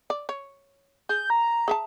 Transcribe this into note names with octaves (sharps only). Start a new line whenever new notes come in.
D5
C#5
G#4 G6
A#5
G#4 E5 A5